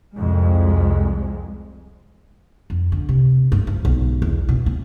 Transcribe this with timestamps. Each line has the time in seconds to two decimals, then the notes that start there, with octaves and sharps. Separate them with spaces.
0.16 C2 F2 G#3
2.70 F2
2.92 D3
3.09 C3
3.52 G2
3.67 F3
3.85 B1
4.22 E2
4.49 B2
4.66 C4